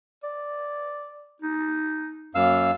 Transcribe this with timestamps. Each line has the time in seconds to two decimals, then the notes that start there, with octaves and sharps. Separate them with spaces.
0.23 D5
1.42 D#4
2.35 F#2 A#3 F5 E6